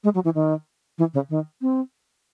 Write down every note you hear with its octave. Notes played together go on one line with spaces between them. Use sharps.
G#3
F#3
E3
D#3
E3
C#3
D#3
C4